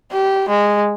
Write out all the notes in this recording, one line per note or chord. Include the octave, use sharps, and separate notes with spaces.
G4
G#3